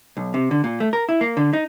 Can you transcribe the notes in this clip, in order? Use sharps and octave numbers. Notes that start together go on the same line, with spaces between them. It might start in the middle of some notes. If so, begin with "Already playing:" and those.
B1
C3
D3
A#2
A3
A#4
E4
A#3
D3
D#4